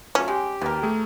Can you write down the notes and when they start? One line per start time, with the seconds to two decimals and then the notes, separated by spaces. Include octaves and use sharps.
0.15 F#3 A3 C#4 F4
0.28 G#3 G4
0.61 D#2 B2 A#4
0.83 A3 G#4